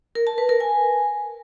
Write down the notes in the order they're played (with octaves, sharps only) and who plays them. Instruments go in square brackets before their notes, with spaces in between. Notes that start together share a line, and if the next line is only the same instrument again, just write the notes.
[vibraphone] A#4
A5
B4
A#4
G#5